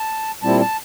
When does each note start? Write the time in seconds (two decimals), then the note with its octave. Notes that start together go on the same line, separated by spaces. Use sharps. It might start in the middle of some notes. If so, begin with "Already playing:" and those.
Already playing: A5
0.42 A#2 G3 C4 E4 A5
0.61 A5